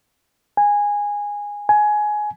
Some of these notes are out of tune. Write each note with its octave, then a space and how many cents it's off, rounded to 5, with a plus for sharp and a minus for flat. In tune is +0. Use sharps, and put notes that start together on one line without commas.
G#5 -15
G#5 +15